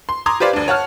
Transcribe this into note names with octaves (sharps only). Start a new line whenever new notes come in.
C6
A#5 C6 D6 D#6 G#6
G4 B4 C5 D5 F5
D2 D4
C#5 F#5 A5 F6